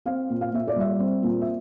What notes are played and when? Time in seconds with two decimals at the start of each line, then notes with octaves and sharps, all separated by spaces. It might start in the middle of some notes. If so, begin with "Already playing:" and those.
0.06 C4 F5
0.30 A#2
0.41 F5
0.52 A#2 E5
0.67 D5
0.76 G3 E5
1.00 C4
1.23 A#2
1.41 E5